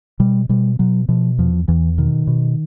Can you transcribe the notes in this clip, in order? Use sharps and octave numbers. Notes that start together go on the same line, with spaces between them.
B2 G3
B2 G3
B2 F#3
B2 F3
E2 F3
E2 E3
B2 D#3
B2